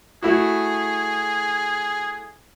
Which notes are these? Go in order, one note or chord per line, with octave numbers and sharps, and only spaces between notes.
A3 E4 F#4 G#4